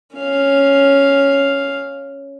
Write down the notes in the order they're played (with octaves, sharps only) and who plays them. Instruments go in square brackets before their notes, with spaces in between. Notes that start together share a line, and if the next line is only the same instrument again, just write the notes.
[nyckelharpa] C#4 F5